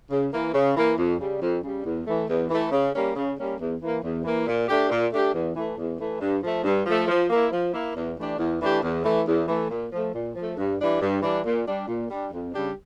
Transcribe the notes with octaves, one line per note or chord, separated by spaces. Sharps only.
C#3
E3 A#3
C#3
E3 A#3
F2
C#3 G3
F2
C#3 G3
E2
E3 A3
E2
E3 A3
C#3
G3 A#3 C#4
C#3
G3 A#3 C#4
E2
E3 A#3
E2
E3 A#3
A#2
A3 D4 G4
A#2
A3 D4 G4
E2
E3 A3
E2
E3 A3
G2
F3 A3
G2
F3 A3
F3
A#3 E4
F3
A#3 E4
E2
E3 A3 D4 G4
E2
E3 A3 D4 G4
E2
E3 A3
E2
E3 A3
A#2
F3 A3
A#2
F3 A3
G2
E3 G3 D4
G2
E3 G3 D4
A#2
G3 D4
A#2
G3 D4
F2
C#3 G3 D4 G4